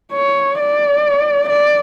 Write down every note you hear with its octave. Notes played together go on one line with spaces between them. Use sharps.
C#5
D5
D5